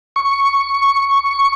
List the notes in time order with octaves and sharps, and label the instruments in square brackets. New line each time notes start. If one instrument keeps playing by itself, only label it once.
[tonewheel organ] C#6